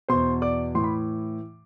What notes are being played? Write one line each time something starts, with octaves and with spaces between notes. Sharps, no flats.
E2 B2 C5 C6
D5 D6
A2 E3 C6
B5